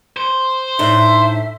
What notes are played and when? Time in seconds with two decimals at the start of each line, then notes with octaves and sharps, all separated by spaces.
0.17 C5
0.79 A2 D4 D#4 E5